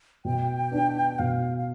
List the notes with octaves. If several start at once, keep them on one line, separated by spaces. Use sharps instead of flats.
B2 G5
B3 D4
B2 F5
F5